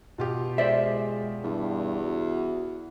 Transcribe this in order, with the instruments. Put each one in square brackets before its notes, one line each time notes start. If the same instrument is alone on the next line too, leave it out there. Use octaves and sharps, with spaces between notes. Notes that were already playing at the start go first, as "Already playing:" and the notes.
[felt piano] B2 F4 G4
[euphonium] G#3 [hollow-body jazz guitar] C5 D5 E5
[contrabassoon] E2 [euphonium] G2
[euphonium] F#4